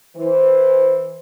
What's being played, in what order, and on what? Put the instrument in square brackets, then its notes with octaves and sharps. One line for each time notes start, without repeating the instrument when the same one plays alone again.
[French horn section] E3 C5